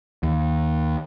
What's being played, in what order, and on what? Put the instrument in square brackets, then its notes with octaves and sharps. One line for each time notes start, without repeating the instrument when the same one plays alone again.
[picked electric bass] D#2